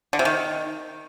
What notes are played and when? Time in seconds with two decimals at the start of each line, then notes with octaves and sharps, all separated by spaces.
0.13 D3
0.19 C3
0.25 D#3